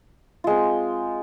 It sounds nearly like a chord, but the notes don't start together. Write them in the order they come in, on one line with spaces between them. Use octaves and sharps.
F4 G#3 C4